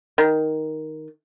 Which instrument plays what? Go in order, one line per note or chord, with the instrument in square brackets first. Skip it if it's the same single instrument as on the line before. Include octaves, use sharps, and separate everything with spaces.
[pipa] D#3